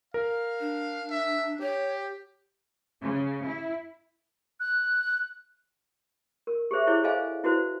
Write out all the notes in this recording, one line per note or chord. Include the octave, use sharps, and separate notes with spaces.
A#4 F5
D4
E5
G4 C#5
C#3
E4
F#6
A#4
G4 G#4 C5 E5
E4 G#4 C5 C#5
G#4 A4 C5 D#5 F5 G#5
E4 F#4 B4 C5